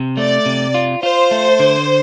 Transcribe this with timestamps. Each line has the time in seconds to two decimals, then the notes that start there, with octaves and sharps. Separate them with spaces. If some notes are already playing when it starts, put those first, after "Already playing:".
Already playing: C3
0.17 A3 D5
0.46 C3
0.74 F4
1.03 F4 C5
1.31 A3
1.60 D3